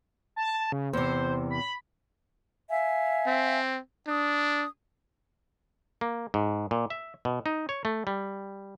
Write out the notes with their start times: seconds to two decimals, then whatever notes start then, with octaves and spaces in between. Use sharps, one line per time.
0.36 A5
0.72 C#3
0.93 E2 C3 C5
1.51 B5
2.69 E5 F5 G#5
3.27 C4
4.07 D4 D#6
6.01 A#3
6.34 G#2
6.71 A#2
6.90 E5
7.25 B2
7.46 D#4
7.69 C#5
7.85 A3
8.07 G3